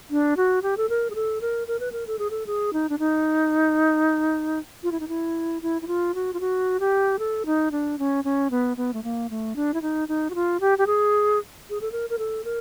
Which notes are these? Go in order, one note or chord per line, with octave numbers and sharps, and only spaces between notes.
D4
F#4
G4
A4
A#4
G#4
A4
A#4
A#4
B4
A#4
A4
G#4
A4
G#4
D#4
D4
D#4
F4
E4
D#4
E4
E4
E4
F4
F#4
F4
F#4
G4
A4
D#4
D4
C#4
C#4
B3
B3
A3
A#3
A3
D4
E4
D#4
D#4
F#4
F4
G4
G4
G#4
G#4
A4
A#4
A#4
A4
A#4